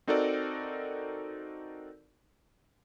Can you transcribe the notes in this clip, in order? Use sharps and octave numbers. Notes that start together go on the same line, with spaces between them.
C4 D#4 F#4 A4 A#4 D5